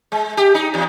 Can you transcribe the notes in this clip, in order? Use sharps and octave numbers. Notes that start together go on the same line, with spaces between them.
G#3
G4
D#4
E2